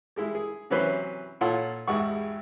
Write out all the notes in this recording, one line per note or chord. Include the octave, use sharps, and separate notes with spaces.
G3 G#3 E4
G#4
C3 E3 F#3 C#4 B4 C5
A#2 F4 A4 C#5 F#5 C6
G#1 E2 G#2 G3 F#5 C#6